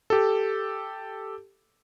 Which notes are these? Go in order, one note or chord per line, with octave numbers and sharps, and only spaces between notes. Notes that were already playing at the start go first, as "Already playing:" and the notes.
G4 A4